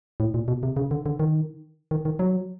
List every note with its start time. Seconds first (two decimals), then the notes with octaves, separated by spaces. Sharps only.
0.20 A2
0.34 A#2
0.48 B2
0.63 C3
0.77 C#3
0.91 D3
1.06 D3
1.20 D#3
1.91 D#3
2.05 D#3
2.19 F#3